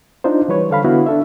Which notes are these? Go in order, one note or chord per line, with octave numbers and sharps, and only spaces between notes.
D4 D#4 F4 C5
E3 G3 B4 C#5
D3 A4 F5 B5
D3 B3 E4 F#4
D4 A4 E5